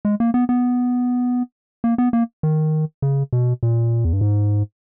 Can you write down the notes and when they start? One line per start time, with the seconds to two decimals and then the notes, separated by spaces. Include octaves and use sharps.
0.05 G#3
0.20 A#3
0.34 B3
0.49 B3
1.84 A#3
1.98 B3
2.13 A#3
2.43 D#3
3.02 C#3
3.33 B2
3.63 A#2
4.05 E2
4.13 G2
4.21 G#2